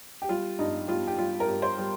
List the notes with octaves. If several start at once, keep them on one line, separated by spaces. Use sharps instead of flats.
G4
G3 F4
G2 D#4
G3 F4
G4
G3 F4
A#4
G2
C5
G3